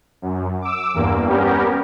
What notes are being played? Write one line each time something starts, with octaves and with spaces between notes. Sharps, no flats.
F#2
D6 E6
E2 G2 A#3
G3 B3 C#4 G4 A#4